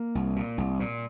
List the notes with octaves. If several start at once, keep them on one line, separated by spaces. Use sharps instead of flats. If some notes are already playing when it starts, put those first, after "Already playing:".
Already playing: A#3
C2
A#2
C2
A#2